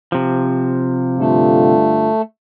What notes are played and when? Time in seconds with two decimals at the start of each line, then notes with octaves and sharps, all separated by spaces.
0.12 C3 F3
1.19 G2 D3 A3 F4